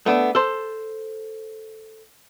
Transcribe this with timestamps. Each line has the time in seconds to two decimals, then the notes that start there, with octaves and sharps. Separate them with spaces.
0.06 A3 B3 D4
0.35 A4 C5